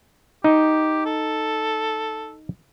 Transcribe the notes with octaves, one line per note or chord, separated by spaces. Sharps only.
D#4 G4
A4